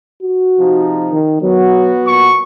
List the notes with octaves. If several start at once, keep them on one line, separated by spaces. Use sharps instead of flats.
F#4
C3 F3 D#4
D#3
F#3 B3 F#4
A#2 C#6